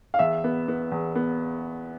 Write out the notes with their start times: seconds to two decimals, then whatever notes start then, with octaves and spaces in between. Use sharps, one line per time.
0.14 F5
0.19 E2 E5
0.44 B3
0.68 B3
0.91 E2
1.15 B3